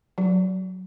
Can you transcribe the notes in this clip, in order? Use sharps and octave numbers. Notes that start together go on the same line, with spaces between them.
F#3